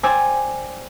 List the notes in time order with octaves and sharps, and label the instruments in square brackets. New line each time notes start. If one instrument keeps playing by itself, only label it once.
[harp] C5 D5 G5 G#5 E6